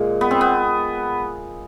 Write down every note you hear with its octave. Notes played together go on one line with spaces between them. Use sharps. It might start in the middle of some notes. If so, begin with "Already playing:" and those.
Already playing: A#2 G#3
B3
C4
B3